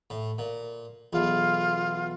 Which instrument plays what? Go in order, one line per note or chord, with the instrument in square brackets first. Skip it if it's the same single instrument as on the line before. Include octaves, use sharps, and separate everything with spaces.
[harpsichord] A2
A#2
[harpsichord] B1 E2 [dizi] F4